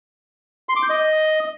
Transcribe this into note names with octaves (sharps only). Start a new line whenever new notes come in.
C6
D6
G6
D#5